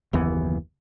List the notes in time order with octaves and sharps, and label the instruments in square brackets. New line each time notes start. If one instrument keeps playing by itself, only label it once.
[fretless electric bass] F#1 D#2 E3 B3